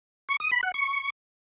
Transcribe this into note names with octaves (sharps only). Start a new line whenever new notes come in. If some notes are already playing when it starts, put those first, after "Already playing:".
C#6
D#6
B5
F#5
C#6